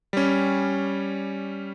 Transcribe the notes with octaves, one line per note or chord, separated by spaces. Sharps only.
G3 C#4